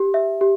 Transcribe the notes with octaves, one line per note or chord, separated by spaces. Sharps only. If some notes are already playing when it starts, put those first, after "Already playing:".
Already playing: G4
E5
G4